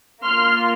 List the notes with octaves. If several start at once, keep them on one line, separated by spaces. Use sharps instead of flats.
A#3 F4 C6 F6